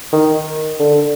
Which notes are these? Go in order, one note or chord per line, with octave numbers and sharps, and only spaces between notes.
D#3
D3